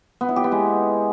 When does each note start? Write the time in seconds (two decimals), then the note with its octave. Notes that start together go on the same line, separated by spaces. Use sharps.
0.21 B3
0.29 E4
0.36 G4
0.44 B3
0.52 G#3